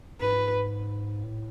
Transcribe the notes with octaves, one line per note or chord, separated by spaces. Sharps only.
G#2 B4
A2